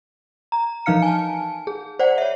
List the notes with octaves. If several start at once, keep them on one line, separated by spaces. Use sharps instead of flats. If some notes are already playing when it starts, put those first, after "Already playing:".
A#5
E3 F3 D#4 F5 F6 C#7
G#5 A5
G#4
C5 D5 F#5
C#5 E5